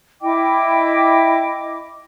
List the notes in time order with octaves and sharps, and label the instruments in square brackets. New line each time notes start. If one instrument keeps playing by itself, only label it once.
[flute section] E4 D#5 G5 D6